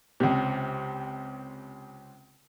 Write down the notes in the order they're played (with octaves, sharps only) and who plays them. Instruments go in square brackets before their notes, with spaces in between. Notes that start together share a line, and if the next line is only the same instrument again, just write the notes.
[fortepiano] C#2 C3